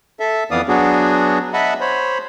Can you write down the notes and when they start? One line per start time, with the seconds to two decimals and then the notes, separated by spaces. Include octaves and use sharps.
0.20 A4 E5
0.51 F2 E3 B3 D5 F5 D#6
0.68 F#3 B3 D4 F#4 G#4
1.53 D#5 E5 F#5 A5 B5
1.81 C5 C#5 B5